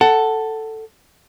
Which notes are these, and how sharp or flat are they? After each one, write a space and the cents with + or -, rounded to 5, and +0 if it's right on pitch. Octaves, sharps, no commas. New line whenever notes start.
A4 +5 F#5 +15